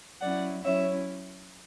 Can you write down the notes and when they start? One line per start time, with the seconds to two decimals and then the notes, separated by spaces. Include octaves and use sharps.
0.21 F#3 C#4 E4 D5 F#5
0.64 F#3 C#4 E4 C#5 E5